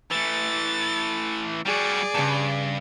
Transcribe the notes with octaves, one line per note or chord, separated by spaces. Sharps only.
E3 A3 A6
G3 F#4 G#4 D5
G2 C#3 A5